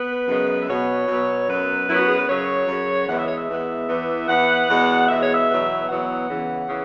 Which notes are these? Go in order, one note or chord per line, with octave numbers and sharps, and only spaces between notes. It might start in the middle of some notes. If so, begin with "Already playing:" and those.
Already playing: B3 B4
F#2 C#3 G#3 B3
E5
B2 F#3 B3 C#5
B2 F#3 B3
F#2 F#3 B3 B4
F#2 F#3 B3 E4
F#4
G#4
B4
F#2 C#3 F#3 C#5
F#2 C#3 F#3
E2 E3 G#3 B3 F#5
E5
C#5
E5
E2 E3 G#3 B3
E2 E3 B3
E2 E3 B3 F#5
E2 B2 G#3
E2 B2 G#3 E5
C#5
E5
E2 B2 F#3 B3
E2 B2 F#3 B3 F#5
E2 C#3 E3
C#3 E3